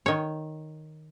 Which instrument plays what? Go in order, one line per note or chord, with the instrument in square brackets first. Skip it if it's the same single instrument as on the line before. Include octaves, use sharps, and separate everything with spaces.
[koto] D#3 C#5